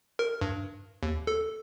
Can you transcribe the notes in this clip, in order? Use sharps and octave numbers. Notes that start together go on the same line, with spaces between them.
A#4
G2
D#2
A4